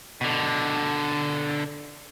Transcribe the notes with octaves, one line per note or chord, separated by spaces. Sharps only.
B2 D3